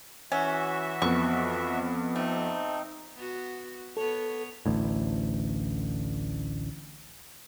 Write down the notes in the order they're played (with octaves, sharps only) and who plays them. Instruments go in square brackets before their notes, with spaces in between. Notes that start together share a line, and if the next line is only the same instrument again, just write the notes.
[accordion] E3 F#4 E5 [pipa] C#4
[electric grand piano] F2 B3 [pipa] C#6
[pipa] A3 [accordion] C4 D#4
[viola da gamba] B3 F#4
[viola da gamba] B3 C#5 [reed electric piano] A4
[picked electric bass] A1 D2 A2